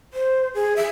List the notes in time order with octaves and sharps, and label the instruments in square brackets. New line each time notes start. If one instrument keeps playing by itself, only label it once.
[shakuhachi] C5
G#4
E5